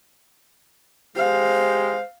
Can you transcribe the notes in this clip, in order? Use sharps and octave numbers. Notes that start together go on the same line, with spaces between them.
G#3 G4 C5 F5